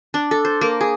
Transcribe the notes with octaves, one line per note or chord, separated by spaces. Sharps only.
D4
A4
C5
A#3
G#4